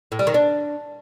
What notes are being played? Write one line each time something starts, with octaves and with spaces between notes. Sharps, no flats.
A2
G3
D#3
D4